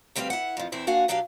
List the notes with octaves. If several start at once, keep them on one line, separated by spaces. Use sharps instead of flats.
D2 G3 C4 G4 B4 F5
E4 F#5
F2 F3
E2 C4 E4 C5
A#3 D4 F#4 F5 F#5 G#5
B2 F#3 D4 G4 F5